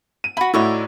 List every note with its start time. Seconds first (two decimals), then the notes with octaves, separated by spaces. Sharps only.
0.24 D#7
0.37 E4 F#4 B5
0.54 A2 D#4 E4 F#4 C#5 D5